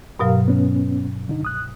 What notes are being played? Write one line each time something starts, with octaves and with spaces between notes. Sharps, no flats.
G2 B2 F#3 G4 A#4 F5
B3 C#4
G2 D3 D#4
C2 D#6 F#6